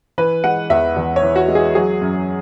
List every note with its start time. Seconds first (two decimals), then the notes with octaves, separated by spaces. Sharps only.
0.18 E3 B4
0.44 G#3 F#5
0.70 E2 E5
0.96 E2
1.16 C#5
1.23 E3
1.36 F#4
1.48 G#3
1.55 G#4
1.75 F#3 G#4
2.01 F#2